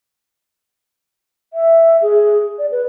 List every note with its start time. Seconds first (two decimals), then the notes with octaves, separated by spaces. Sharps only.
1.53 E5
2.02 G#4
2.59 D5
2.71 B4